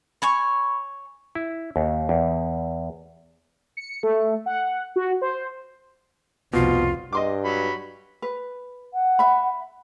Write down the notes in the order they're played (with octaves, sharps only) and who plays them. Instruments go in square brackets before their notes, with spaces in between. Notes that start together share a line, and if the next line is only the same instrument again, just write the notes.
[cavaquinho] C#5 G#5 C#6 [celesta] B5
[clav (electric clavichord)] E4
D#2
E2
[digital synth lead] C#7
A3
F#5
F#4
C5
[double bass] F1 C2 [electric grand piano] B2 [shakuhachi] F4
[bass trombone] G2 [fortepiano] D#5 C6 D6
[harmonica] F#3 B5
[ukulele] B4
[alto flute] F#5
[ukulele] E5 B5